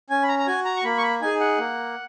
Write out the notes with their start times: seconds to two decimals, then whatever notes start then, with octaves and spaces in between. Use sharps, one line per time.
0.10 C#4 G#5
0.23 B5
0.28 A#5
0.39 A#5
0.47 F#4 G#5
0.65 A#5
0.76 C#6
0.84 A#3 B5
0.98 C#6
1.02 B5
1.21 D#4 G#4 G#5
1.40 F#5
1.58 A#3